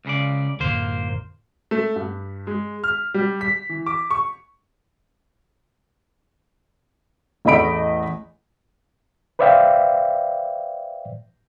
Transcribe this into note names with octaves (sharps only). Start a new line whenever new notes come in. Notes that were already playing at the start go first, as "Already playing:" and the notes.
C#2 C#3 D5
F#2 A2 D3 A#3 C5
A3
G2
G#3
F6
G3
B6
E3
D6
C#6
A1 E2 A3 D#5 B5 D7
B4 C5 D5 E5 F5 G5